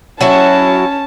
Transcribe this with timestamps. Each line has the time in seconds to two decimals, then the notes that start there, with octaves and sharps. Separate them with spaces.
0.21 F#3 C#4 E4 F#4 A5